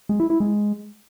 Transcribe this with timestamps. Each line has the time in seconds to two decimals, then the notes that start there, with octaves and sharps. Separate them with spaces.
0.09 G#3
0.20 E4
0.30 E4
0.40 G#3